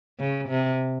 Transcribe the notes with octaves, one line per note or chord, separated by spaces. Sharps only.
C#3
C3